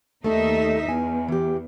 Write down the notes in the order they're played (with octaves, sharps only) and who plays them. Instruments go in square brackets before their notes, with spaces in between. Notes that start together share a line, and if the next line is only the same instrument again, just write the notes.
[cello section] D#2 D#4 E5 [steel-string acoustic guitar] A3 A4
[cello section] E2 [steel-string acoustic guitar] G#5
[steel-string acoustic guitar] E3 G4